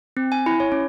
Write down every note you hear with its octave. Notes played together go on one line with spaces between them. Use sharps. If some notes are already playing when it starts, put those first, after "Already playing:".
C4
G#5
E4
C#5
C#4